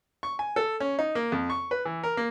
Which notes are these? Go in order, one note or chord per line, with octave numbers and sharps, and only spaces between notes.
C#6
G#5
A4
C#4
D#4
A#3
F2
C#6
B4
E3
A#4
A#3